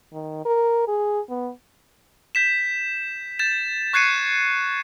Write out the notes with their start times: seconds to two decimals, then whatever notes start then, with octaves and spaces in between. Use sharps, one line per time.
0.13 D#3
0.45 A#4
0.88 G#4
1.29 B3
2.35 G6 B6 E7
3.39 G6 A6 E7
3.93 C#6 F#6 G#6 C7 C#7 D#7